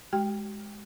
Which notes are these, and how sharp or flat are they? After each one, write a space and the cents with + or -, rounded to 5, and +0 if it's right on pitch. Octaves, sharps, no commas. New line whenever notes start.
G#3 +0 G4 -40 G5 +10